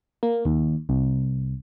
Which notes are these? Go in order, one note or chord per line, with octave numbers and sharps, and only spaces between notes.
A#3
D#2
C2